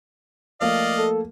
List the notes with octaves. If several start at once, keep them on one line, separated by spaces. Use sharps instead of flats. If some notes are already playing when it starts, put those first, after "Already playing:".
F3 A3 A#3 D5 D#5 F5
A4